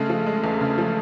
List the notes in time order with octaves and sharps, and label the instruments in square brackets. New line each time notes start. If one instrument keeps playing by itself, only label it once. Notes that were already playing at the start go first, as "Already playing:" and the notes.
Already playing: [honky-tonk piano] C#3 G#3 [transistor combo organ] A3
[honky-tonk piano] F3
G#3
E2
C#3
F3